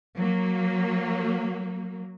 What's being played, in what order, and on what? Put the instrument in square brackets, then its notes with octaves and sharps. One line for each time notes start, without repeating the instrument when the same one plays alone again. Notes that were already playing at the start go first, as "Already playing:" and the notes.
[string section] F#3 A#3